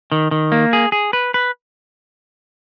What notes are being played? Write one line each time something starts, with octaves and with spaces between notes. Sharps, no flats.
D#3
D#3
A#3
G#4
G#4
B4
B4